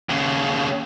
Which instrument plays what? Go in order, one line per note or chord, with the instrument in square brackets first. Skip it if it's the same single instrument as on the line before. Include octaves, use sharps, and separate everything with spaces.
[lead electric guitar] D#2 C#3